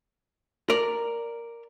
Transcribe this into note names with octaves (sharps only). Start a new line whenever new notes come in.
A#4 D5